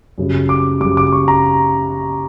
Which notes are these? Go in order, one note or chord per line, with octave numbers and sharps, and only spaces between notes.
F#2 C#3 G3
D6
F#2 C#3 G3 D6
D6
C#6
A#5